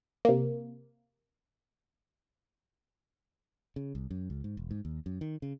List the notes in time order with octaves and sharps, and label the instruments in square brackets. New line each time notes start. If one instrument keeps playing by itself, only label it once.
[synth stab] C3 A#3
[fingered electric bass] C#3
C2
F#2
C#2
G#2
E1
G#2
D#2
F#2
D#3
C#3